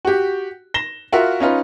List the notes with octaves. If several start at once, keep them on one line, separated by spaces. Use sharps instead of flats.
F#4 G4
A#6 E7 G7
F4 F#4 A#4 E5
C#4 D#4 F4 B4